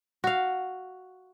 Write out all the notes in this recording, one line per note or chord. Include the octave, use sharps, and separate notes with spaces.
F#4 F5